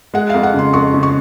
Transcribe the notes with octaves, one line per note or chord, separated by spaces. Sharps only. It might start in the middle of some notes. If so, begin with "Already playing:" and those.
G#3 F#5
F2 F5
F#5
C#3 C6
F2 C#6
C#3
C#6